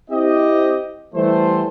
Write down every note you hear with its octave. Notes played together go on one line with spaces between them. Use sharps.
C4 E4 G4 D#5
E3 G3 A3 C5